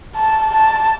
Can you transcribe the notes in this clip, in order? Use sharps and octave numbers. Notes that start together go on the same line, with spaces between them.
A5
A5